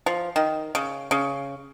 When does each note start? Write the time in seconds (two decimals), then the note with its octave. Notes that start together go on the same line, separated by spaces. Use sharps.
0.06 F3
0.36 D#3
0.75 C#3
1.11 C#3